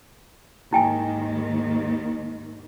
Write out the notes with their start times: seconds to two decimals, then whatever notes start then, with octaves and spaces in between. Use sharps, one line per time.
0.73 D#2 G#2 D#3 E4 G5 G#5